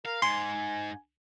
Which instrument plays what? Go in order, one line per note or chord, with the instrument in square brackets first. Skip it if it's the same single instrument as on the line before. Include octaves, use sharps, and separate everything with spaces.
[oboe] A#4 [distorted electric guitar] F5
[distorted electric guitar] G#2 [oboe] G#5 [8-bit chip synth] C6